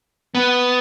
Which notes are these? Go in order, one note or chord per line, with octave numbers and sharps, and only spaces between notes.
B3